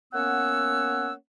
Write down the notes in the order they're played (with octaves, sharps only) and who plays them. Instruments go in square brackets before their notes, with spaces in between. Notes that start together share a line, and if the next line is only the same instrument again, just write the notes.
[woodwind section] A#3 B3 C#4 C#5 F#5 E6